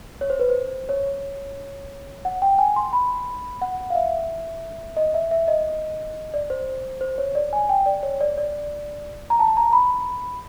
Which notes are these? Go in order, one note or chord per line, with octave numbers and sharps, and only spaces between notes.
C#5
C5
B4
C5
C#5
F#5
G5
G#5
C6
B5
F#5
F5
E5
D#5
E5
E5
D#5
D5
C5
C5
C#5
D5
G#5
G5
D5
C#5
D5
D5
A#5
A5
A#5
B5